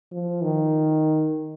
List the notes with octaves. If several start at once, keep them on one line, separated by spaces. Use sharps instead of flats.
F3
D#3